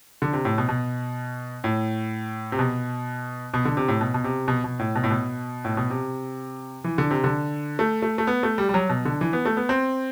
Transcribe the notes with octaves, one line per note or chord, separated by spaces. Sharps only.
D3
C3
A2
B2
B2
A2
C3
B2
B2
D3
C3
A2
B2
B2
C3
B2
B2
A2
B2
A2
B2
A2
B2
C3
E3
D3
C3
D3
A3
A3
A3
B3
A3
G3
G3
F#3
B2
D3
E3
B3
A3
B3
C4